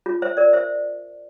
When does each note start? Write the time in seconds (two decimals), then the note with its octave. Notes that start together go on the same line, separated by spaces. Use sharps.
0.06 F4
0.22 C5 E5
0.37 A#4 D5
0.53 C5 E5